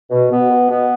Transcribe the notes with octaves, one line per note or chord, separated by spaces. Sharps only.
B2
B2 B3
B2
B2 B3